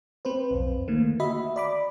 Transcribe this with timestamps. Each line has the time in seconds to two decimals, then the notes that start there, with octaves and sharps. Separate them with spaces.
0.25 C4 B4 C5
0.51 B1 F2
0.88 D3 D#3 A3 A#3
1.20 F#4 D#5 E5 B5
1.56 D5 B5 D6